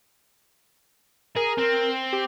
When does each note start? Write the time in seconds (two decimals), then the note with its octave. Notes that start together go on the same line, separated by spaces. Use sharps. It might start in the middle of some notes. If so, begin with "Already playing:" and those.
1.36 G#4 A#4
1.58 C4
2.13 G4